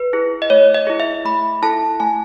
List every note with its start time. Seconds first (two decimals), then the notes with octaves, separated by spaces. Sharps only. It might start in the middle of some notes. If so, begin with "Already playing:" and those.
Already playing: B4
0.13 E4 G#4
0.42 D#5
0.50 A3 C#5
0.74 D#5
0.87 E4 G#4
1.00 E5
1.25 A3 B5
1.63 E4 A4 A5
2.00 A3 G#5